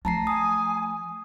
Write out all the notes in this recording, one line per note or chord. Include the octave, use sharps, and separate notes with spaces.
F3 A3 A5 A#5 C7
G#5 D#6